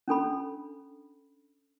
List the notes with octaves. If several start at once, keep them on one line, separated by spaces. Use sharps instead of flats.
C#4 D4 A4 B5